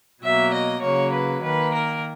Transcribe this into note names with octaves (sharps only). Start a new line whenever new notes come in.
B2 F#3 A#3 E5
D#5
C#3 F#3 A#3 C#5
B4
D#3 A#3 B4
A#4